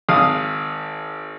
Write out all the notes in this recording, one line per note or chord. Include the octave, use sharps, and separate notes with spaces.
G#1 F5 D#6